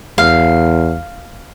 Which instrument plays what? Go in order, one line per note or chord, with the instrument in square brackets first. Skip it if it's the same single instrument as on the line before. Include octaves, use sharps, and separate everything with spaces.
[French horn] E2 [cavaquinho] F5